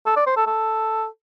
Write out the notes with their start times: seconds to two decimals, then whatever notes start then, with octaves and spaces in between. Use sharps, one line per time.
0.07 A4
0.17 D5
0.27 C5
0.37 A4
0.47 A4